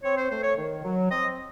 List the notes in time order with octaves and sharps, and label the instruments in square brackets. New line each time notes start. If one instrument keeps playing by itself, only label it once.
[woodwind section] C4 C#5
C5
A3 C5
C#5
D#3
F#3
C4 D#5